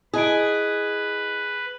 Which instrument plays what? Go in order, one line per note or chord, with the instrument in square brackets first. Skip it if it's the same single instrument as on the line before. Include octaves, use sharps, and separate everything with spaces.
[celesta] E4 D#5 D7 [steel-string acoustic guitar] G#4 [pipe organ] B4